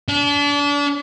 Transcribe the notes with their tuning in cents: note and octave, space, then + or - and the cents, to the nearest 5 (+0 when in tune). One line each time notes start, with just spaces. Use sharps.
D4 -35